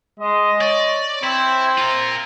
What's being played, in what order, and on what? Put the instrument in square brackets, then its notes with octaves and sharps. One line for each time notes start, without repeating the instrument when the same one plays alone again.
[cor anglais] G#3 [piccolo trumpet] D#5
[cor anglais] C#5 [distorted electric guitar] D5
[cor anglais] C4 [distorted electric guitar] E4 [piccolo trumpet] C5
[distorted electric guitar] F4 A#4